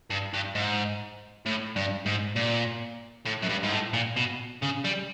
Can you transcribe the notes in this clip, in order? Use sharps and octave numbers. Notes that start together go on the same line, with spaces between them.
G2
G2
G#2
A2
G2
G#2
A#2
A2
F#2
G2
G#2
A2
A#2
B2
C#3
G3